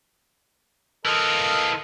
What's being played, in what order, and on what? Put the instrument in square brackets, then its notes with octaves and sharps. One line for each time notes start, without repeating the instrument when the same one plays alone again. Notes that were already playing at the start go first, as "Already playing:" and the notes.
[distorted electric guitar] E3 F4 [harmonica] A4 A#4 D#5